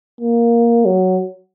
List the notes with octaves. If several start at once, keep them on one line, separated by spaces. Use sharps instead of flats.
A#3
F#3